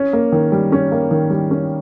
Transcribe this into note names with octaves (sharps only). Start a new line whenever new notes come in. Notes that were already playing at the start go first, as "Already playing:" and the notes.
Already playing: C#4
A#3
D#3
G3
C#4
A#3
D#3
G3
C#4